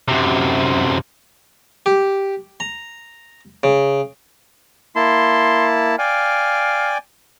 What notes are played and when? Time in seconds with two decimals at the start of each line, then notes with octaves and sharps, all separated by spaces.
0.08 F#2 C3
1.86 G4
2.60 A#5
3.63 C#3
4.96 A#3 E4 A5 C6
5.99 D5 F5 G5 G#5